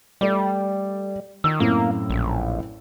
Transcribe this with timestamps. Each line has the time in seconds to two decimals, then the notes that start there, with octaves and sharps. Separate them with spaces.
0.21 G3 A3 D5
1.44 D#3 E6
1.60 F#2 A2 A#3 C4
2.10 A#1